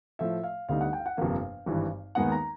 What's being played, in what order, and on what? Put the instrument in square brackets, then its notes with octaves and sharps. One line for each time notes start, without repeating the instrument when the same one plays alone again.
[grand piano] A2 F3 A3 E5
F5
D2 D3 G3 B3 D#4 F5
F#5
G5
F5
F#5
G1 F2 C3 F3 A#3 F5
G#1 G2 E3 G3
D#2 D#3 G#3 B3 D#4 F#5
A#5